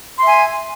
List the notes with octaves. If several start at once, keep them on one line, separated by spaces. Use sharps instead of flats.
E5 G#5 C6